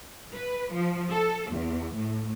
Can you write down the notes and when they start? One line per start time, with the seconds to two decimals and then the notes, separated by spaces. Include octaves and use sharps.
0.34 B4
0.72 F3
1.10 A4
1.51 E2
1.95 A2